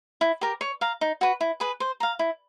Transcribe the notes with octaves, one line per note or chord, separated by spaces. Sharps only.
E4
G4 A#4
C#5
F5 A#5
D#4
F#4 B4
E4
G#4 B4
C5
F5 A#5
E4